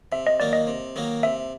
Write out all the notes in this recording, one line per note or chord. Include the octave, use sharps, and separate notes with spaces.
C3 E5
D#5
D#3 F#3 A#3 D5
D#5
C3
D#3 F#3 A#3
C3 E5